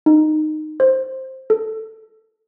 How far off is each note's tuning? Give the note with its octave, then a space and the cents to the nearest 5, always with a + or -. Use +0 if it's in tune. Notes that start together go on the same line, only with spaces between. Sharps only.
D#4 -15
C5 +5
A4 +5